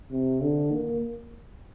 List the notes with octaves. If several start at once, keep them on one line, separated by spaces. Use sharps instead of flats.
C3
D3
A#3